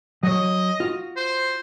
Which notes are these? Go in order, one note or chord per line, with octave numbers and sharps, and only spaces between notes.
F#3 C#5 D#5
F4 F#4
C5